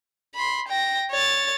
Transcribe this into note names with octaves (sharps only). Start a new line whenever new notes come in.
B5 C6
G5 A#6
C#5 A6